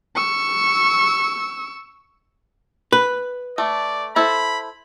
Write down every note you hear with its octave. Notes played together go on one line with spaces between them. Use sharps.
C#6 E6
B4
A3 D5
E4 A4 C5 B5